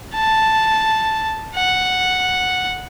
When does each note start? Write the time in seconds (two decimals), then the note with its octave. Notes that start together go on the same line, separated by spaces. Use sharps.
0.15 A5
1.55 F#5